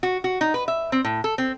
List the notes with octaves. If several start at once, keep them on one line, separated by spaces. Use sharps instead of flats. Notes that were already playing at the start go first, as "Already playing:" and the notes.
F#4
F#4
D#4
B4
E5
C4
A2
A4
C4